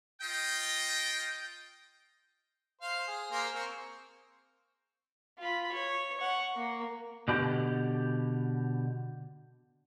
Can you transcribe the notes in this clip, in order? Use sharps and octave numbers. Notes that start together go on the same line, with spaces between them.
F4 D#5 G5
C5 F5
G#4
A#3 G#4 C5
C4 C#6
F4 B5
C#5
F#5 C#6
A#3
B2 D3 G4